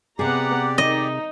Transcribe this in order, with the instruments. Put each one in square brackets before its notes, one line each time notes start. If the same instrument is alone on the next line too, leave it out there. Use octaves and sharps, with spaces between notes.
[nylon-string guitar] C3 G#4 [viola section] B3 F#5 A#5 [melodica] G4 D5
[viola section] D#4 [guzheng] D#5